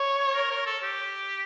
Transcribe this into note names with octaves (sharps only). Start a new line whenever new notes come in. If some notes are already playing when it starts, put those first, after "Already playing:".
Already playing: C#5
A#4
A#4
A4
G4